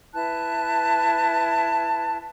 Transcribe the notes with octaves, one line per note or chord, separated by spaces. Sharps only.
E4 B4 A5 F#6